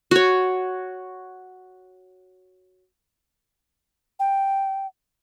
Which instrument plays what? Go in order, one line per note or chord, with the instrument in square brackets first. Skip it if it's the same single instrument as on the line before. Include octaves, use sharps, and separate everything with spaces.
[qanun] F#4 C#5
[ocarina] G5